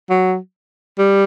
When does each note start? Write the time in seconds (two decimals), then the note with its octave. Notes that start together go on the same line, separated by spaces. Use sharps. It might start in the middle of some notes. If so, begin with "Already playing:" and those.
0.10 F#3
0.98 G3